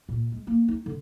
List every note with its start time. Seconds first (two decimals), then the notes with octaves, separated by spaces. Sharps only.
0.09 A#2
0.32 G#3
0.47 A#3
0.68 D#4
0.86 D3